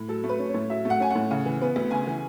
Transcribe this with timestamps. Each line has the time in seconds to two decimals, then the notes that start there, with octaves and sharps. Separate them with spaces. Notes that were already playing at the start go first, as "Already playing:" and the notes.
Already playing: A2
0.08 F#3 A4
0.24 A3
0.29 B4
0.39 C#4
0.49 C#5
0.54 A2
0.70 F#3 E5
0.85 A3
0.90 F#5
1.00 C#4 G#5
1.11 A2 F#5
1.31 C#3
1.46 E3
1.62 B3
1.76 D2
1.91 C#3 G#5
2.07 E3